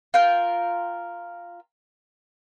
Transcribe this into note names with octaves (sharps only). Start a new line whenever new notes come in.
F4 A#4 G5